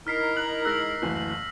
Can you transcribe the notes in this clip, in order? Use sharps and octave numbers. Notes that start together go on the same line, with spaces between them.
D#4 E4 A#4 F6 B6 C7
F6 F#6 F#7
G#3 E6 F#6 A#6 F#7
F#1 D2 E3